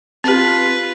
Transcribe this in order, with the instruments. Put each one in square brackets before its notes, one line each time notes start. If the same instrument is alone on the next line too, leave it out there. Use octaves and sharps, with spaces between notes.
[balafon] C4 G4 [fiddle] F4 B4